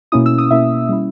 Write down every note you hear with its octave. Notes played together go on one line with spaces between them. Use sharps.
B2 A#3 C#4 E4 D#6
E6
D#6
B2 A#3 C#4 E4 E5
G3 C#4 E4